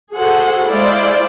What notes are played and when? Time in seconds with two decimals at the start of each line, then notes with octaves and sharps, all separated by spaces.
0.14 F#4 G#4 A4 C5 F#5
0.68 G#3 E4 C5 D5 F5